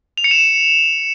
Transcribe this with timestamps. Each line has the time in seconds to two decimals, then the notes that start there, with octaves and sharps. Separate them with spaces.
0.18 F7
0.24 C#7
0.31 E7